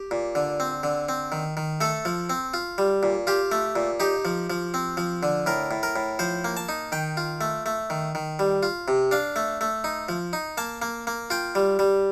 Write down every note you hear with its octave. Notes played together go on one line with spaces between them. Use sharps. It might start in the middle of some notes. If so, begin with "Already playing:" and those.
Already playing: G4
A#2
D3
C4
D3
C4
D#3
D#3
A3 A4
F3
C4
F4
G3
A#2
F4 G4
A3
A#2
D#4 G4
F3
F3
C4
F3
D3
A2 A#4
A2
A#4
A2
F3 C5
A#3
A5
D#4
D#3 G5
F4
A3
A3
D#3
D#3
G3
F4
C3
D4 F5
A3
A3
D#4
F3
D#4
A#3 A5
A#3
A#3
F4 G5
G3
G3